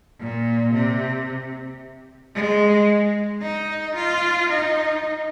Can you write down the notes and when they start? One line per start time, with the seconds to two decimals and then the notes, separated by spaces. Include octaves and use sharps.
0.20 A#2
0.74 C3
2.35 G#3
3.42 D#4
3.96 F4
4.49 D#4